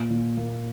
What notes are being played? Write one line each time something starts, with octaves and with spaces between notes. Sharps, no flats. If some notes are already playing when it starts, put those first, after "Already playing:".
Already playing: A#2
A#2
A#3